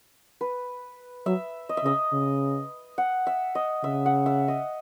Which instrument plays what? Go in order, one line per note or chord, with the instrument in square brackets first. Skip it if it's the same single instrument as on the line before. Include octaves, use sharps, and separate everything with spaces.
[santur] B4
[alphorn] F#3 [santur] E5
[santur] D#5
E5
[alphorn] C#3 [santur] D#5
[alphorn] C#3
[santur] F#5
E5
D#5
[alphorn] C#3 [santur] E5
[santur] F#5
E5
D#5